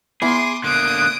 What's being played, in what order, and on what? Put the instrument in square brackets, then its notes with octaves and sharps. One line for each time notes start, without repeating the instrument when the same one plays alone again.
[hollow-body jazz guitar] B3 E4 G#5 [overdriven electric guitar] G#4 [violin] C6 D6
[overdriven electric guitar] D3 A#3 [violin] D#6 D7 [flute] F#6